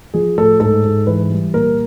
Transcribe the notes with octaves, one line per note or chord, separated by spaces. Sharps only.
F3 G#4
A2 A4
G#2 A4
G#2
E3 B4
G3
A#2 A#4